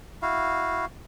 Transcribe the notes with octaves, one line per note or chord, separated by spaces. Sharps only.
E4 F#4 F5